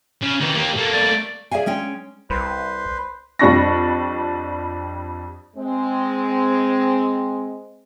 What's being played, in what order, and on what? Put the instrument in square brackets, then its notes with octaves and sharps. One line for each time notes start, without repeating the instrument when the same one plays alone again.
[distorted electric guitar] C#3
D#3 E3
A#3 G4
A3 A#3
[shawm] D5
[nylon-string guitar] G#4 D5 E5 F5 G#5
G#3 C#4 G5
[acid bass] C2 [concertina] B4 C5
[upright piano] F2 G3 D4 C#6 A#6
[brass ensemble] G#3 C4